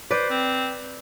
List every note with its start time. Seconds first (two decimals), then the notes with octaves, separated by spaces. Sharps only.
0.11 B4 C5 D5
0.30 C4